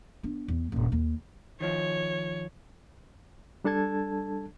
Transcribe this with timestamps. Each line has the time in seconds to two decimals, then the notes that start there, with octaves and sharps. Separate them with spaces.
0.23 B3 D4
0.48 E2
0.72 D#1 G2
0.92 D#2
1.61 D#3 F3 C#5
3.64 G3 D4 A4 A5 G#6